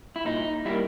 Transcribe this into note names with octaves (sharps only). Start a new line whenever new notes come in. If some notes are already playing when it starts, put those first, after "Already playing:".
E4
A#2 D#4
G3 A#3 E4